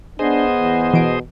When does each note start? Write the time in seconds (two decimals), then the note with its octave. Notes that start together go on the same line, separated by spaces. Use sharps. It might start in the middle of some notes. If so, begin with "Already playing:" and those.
0.19 B3 D4 G#4 C5 D#5
0.60 E2
0.94 B2 E3 D7